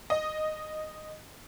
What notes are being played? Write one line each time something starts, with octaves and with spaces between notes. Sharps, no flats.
D#5